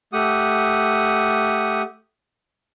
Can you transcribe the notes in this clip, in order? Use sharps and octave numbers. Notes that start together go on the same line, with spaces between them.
A3 G4 F#5 D#6